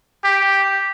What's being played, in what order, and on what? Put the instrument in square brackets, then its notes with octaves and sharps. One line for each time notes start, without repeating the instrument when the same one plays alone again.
[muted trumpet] G4